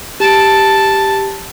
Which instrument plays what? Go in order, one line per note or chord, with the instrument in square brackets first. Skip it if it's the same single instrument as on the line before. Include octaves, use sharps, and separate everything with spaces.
[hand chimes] G4 D7 [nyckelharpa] A5